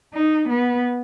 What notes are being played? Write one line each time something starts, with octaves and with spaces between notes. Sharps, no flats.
D#4
B3